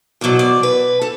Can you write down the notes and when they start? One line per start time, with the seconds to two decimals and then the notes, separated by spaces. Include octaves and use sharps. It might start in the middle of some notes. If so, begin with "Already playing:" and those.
0.21 E2 B2 F#3 D5
0.39 D5
0.63 B4
1.02 A4